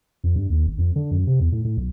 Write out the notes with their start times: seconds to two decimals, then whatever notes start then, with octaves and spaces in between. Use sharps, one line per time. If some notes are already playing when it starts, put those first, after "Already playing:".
0.24 F2
0.36 G2
0.50 D#2
0.67 G#1
0.78 F2
0.96 D3
1.11 F#2
1.27 C3
1.40 E2
1.52 A2
1.65 A2
1.77 B1